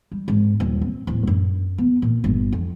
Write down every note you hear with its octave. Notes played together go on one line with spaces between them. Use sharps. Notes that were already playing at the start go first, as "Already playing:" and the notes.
G3
G#1
D#1
C4
D1
F#2
B3
A#2
G1
F2